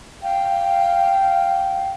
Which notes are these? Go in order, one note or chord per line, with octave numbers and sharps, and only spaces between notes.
F5 G5